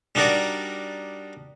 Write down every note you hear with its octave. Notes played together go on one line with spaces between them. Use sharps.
G3 D4 D#4 F#4 A#4 D5